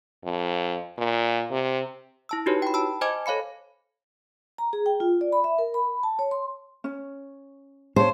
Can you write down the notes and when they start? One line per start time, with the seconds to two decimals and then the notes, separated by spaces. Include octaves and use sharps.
0.25 F2
0.98 A#2
1.51 C3
2.29 E4 A5 E6
2.46 D#4 E4 F#4 G4 B4 C#5
2.62 G5 B5
2.74 A5 B5 E6
3.01 C5 D#5 G#5 A5 D6 G#6
3.26 A4 C#5 F5 B5 C#7
4.58 A#5
4.73 G#4
4.86 G5
5.00 F4
5.21 D5
5.32 B5
5.44 E5
5.59 A#4
5.74 B5
6.03 A5
6.19 C#5
6.31 C6
6.84 C#4
7.96 C5 C#5 F5 A5